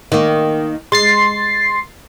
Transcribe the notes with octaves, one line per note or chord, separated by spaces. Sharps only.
D#3 A#3
G#3 C6 A6 C7